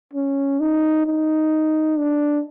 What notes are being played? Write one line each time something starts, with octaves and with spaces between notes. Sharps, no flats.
C#4
D#4
D#4
D4